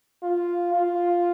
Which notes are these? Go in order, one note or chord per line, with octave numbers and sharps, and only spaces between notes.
F4
F4